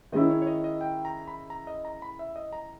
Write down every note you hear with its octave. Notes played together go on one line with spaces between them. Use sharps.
D#3 G#3 C#4 E4 D#5
C#5
C#5
D#5
D#5
G5
A#5
B5
A#5
D#5
A#5
B5
E5
D#5
A#5